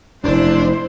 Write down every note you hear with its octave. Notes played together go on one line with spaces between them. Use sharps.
F1 F#2 D4 E4 C5